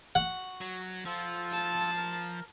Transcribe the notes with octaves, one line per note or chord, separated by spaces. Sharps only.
F#4 F#5
F#3
F3 F4 A4
A5
A#4